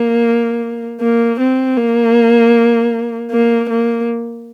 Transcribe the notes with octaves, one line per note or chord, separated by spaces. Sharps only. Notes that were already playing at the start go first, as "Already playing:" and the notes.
Already playing: A#3
A#3
C4
A#3
A#3
A#3